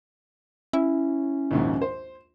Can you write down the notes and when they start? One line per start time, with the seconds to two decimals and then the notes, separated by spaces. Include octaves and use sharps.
0.73 C#4 E4
1.51 A#1 D#2 G#2
1.81 C5